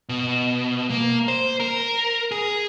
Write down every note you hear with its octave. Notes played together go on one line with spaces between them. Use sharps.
B2
A#3
C5
A#4
G#4